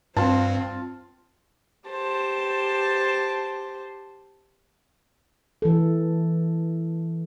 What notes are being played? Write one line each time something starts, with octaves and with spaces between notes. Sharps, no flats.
G2 C4 F4 A5
G4 C5 A5
E3 A4